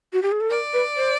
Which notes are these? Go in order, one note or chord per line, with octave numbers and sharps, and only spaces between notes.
F#4
G4
G#4
A4
A#4 D5
B4
C5